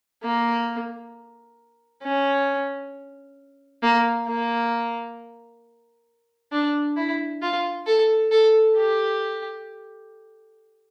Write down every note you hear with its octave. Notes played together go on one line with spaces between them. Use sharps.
A#3
C#4
A#3
A#3
D4
E4
F4
A4
A4
G4